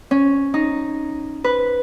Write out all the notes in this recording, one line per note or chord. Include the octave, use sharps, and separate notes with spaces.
C#4
D#4
B4